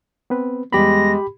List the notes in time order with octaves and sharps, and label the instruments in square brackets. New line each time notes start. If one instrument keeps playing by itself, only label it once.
[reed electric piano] B3 C4 B4
[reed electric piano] E2 G3 B3 [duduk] G#3 [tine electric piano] G4 B5 [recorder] A#6